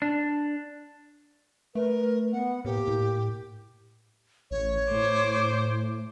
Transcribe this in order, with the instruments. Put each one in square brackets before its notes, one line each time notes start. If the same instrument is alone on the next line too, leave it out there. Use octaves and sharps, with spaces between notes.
[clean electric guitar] D4
[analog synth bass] A3 [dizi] A#4 [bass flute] B4
[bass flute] B3 [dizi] F#5
[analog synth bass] A2 [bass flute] A#3 [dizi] G4
[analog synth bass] A2
[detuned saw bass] A1 [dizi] C#5
[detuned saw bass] A2 [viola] C5 D6